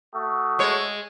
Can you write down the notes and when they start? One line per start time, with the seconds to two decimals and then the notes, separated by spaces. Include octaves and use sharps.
0.14 A3 F#4 D#6
0.59 G#3 C#5